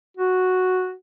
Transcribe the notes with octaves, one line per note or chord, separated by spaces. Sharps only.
F#4